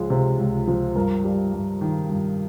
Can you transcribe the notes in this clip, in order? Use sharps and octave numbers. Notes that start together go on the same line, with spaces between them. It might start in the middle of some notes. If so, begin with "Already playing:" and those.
Already playing: C#2 F3 G#3
C3
C#2
F3
G2 A#4
G3
G2
D#3
G2